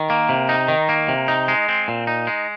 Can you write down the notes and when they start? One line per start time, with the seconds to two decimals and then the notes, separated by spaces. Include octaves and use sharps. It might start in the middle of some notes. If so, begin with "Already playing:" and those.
Already playing: D#3
0.10 A#3
0.29 C3
0.49 D#4
0.68 D#3
0.89 A#3
1.08 C3
1.28 D#4
1.48 G#3
1.69 C4
1.88 A#2
2.07 D#4
2.27 G#3